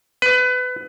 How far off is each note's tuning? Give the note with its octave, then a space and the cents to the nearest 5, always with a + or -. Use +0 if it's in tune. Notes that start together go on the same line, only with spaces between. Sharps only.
B4 +25